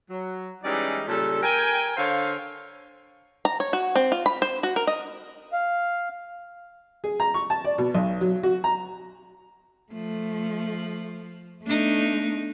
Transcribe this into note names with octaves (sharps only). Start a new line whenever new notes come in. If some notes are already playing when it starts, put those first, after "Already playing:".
F#3
E3 G3 G#3 C#4 D#4 D5
A#2 C#3 G3 A4
A#4 G5 G#5
D3 C5 C#5 F5
A#5
C#5
F#4
C4
F4
B5
C5
F#4
A#4
D#5
F5
G#4
A#5
C#6
A5
D5
B2
B1
F#3
F#4
A#5
F3 A3
A3 B3 D4 D#4